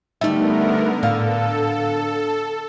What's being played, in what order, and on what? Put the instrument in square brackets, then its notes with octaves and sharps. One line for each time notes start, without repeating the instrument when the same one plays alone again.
[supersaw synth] D3 B3 A#4 [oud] G3 A3 [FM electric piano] D#4 E5
[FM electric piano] A2 F5 [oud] D3 [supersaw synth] A4